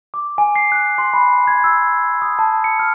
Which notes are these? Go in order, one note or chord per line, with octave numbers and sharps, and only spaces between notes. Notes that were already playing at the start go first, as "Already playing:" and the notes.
D6
G#5
C7
F#6
C6
B5
G#6
E6
D#6
A5
C#7
F6